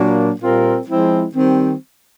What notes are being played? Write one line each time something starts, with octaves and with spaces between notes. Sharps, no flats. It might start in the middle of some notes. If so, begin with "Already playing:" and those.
Already playing: A#2 F#3 A#3 D4 F#4
A#2 G3 C4 F4 A#4
F3 G#3 C4 E4
D#3 G3 C4